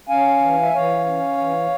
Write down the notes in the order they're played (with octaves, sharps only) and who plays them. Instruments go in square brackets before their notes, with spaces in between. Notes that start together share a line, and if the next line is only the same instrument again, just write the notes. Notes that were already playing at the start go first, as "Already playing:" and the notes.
[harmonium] C#4 F5 G#5
E3
E5
E3 C#5 F5
C#4
E3